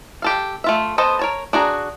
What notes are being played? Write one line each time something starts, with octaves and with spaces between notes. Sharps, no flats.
G4 A4 F5
A3 F4 E5
B3 A4 C5 D#5
A#4 C#5 A5
D4 F#4 G#4 A#5